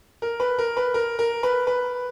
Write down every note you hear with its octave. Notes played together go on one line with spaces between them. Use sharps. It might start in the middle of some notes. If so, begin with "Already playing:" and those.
A#4
B4
A#4
B4
A#4
A#4
B4
B4